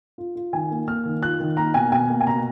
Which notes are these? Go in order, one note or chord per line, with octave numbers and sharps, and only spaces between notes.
F4
F4
D#3 G#5
A#3
A#3 F6
D#3
F4 F#6
D#3
A#3 A#5
B2 G#5
B2 G#5
A#3
G#5
B2 A#5